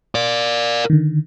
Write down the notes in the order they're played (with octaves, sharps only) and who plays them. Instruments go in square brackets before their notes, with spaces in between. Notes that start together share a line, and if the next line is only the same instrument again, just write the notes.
[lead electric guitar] A#4 D5
[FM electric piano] D3 D#3